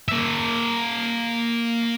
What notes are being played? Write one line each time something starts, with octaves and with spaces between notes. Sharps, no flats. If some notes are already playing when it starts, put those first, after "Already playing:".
A#3 E5